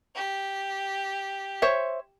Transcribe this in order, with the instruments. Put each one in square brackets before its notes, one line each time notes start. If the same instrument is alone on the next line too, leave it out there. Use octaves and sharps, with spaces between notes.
[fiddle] G4
[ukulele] C5 C#5 E5